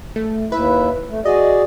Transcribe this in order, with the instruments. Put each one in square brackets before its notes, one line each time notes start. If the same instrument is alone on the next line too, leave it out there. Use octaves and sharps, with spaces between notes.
[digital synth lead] A3
[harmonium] D#2 E4 E5 [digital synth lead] B4
[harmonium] A3
[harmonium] F#4 G#4 D5 [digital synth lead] D#5